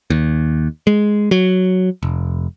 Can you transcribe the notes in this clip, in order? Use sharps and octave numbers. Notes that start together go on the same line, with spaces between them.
D#2
G#3
F#3
F1